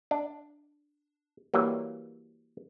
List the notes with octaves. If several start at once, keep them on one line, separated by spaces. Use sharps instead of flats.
D4
E3 F#3 G3 A#3